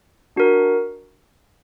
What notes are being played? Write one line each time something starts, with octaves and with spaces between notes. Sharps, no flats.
D4 F#4 A#4